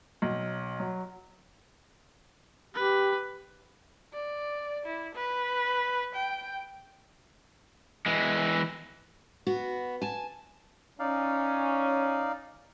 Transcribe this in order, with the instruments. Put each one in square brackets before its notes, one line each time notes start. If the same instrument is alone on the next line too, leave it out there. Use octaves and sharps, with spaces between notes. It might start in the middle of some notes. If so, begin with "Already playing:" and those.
[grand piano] B1
F#3
[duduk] G4 [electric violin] B4
[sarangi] D5
E4
B4
G5
[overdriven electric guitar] E3 G#3
[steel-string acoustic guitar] B3 F#4
G#5 A5
[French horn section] C#4 [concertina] D#4 D5 F5